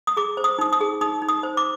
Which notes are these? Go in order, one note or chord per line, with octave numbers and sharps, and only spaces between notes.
D#6
G#4 D6
C5
D#6
D#4 D#6
D#6
G#4
D#4 D#6
D#4
D#6
C5
D6